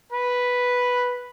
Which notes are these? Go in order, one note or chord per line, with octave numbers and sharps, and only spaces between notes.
B4 B5